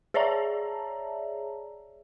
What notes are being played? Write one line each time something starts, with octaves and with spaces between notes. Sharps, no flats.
G#4 C#5 D5 E5 A5 A#5